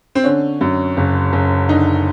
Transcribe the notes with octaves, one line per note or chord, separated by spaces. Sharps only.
C4
D3 C#4
F#2
F#1
F#1
D3 D#4